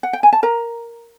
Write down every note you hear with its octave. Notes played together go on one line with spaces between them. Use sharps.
F#5
G5
G#5
A5
A#4 A#5